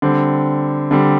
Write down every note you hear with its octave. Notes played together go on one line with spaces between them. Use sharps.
D3 G3 C4
D3 G3 C4